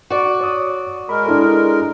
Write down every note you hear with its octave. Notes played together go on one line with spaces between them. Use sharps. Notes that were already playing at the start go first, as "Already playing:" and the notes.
F#4 D5
C#5 D#6
G#3 A#4 B5
D4 E4 A4